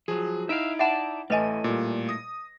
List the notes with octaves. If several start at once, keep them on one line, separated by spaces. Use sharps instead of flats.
F3 F#3 G#4
D#4 E4 E5 F5 D7
D5 E5 F#5 A5 B5
A1 A2 A3 B4 D#5 G#5 D#7
A#2 G3
D#6 A#6